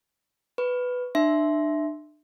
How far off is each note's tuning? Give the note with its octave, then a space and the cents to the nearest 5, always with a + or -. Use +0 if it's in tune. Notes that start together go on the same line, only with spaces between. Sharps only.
B4 +5 C#6 +0
D4 +35 E5 +0 C6 +0